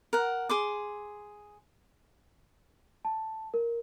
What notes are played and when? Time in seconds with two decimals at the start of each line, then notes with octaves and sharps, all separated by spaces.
0.13 A#4 F#5
0.49 G#4 C6 D6
3.05 A5
3.54 A#4